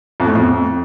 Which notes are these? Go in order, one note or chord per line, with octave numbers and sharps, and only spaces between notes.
F2
A2
F2